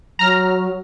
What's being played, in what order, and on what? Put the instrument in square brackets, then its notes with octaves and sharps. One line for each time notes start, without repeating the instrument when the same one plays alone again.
[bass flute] F#3 [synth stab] A#5 F6